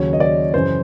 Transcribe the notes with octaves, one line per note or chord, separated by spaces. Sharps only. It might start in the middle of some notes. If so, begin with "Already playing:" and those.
Already playing: D#2 C#3 F#3 C#5
D#5
D5
F#2 C#3 E3 C5